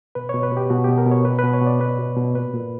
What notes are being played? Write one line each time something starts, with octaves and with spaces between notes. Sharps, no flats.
B2 B4
B2 C#5
B4
B2 G4
B2 F#4
B2 G4
A#4
B2 C#5
B2 B4
B4
B2
C#5
B2 D5
B2 B4
B2
B2
A#2 B4
A#2